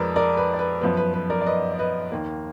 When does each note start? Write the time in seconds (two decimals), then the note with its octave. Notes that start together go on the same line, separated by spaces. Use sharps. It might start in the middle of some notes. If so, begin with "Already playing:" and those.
Already playing: F2 F3 G#3 A#4 B4 D5
0.16 A#4 D5
0.37 B4
0.54 D5
0.59 B4
0.81 F#2 F3 B3 B4
0.97 B4
1.14 B4
1.30 A#4 D5
1.41 D5
1.46 B4 D#5
1.74 D5
1.79 B4 D#5
2.12 D#2 D#3 A#3